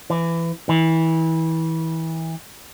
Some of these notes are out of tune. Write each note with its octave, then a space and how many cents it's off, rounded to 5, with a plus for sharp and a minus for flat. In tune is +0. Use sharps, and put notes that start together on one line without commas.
E3 +20
E3 -25